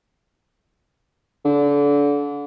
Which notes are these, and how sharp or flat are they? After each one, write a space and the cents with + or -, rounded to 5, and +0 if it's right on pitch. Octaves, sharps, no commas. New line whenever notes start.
D3 -30